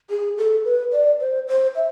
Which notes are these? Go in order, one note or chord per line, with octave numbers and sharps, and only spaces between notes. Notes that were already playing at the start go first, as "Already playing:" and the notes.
G#4
A4
B4
D5
C5
C5
E5